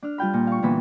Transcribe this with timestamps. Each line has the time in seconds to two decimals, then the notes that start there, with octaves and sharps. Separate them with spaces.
0.03 D4 F6
0.18 G3 F4 G5 B5
0.33 A#2
0.47 F5 C#6
0.62 A#2 D3 E3 B3 B5